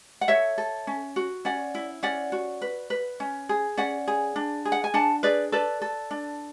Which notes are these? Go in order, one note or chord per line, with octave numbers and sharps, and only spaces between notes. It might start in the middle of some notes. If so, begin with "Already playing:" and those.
F#5
A4 C#5 E5
A4
C#4
F#4
C#4 D5 F#5
E4
C#4 D5 F#5
F#4
B4
B4
C#4
G#4
C#4 D5 F#5
G#4
D4
G#4
F#5
G#5
D4 F#5 A5
G#4 B4 D5
A4 B4 D5
A4
D4